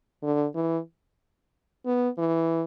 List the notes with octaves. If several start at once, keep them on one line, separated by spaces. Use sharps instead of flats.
D3
E3
B3
E3